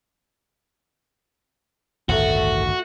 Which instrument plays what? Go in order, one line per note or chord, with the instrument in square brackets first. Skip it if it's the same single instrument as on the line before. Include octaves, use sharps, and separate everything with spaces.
[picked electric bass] A1 D2 [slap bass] G2 D#3 [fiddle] A3 [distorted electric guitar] F#4